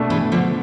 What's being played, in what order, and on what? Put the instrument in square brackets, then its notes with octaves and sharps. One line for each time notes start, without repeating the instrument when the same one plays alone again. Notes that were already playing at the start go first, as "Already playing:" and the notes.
Already playing: [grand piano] B2 A3 D4
[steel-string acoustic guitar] E3 G#3
D3 F3